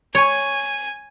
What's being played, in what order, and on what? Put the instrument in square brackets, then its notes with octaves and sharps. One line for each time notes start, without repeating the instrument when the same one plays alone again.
[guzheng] C#5 [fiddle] G#5